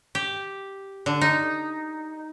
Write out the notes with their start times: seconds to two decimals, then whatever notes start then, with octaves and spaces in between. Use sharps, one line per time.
0.15 G4
1.06 D3
1.21 D#4